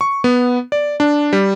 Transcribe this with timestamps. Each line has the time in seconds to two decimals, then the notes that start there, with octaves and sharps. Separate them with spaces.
0.01 C#6
0.24 B3
0.72 D5
1.00 D4
1.33 G3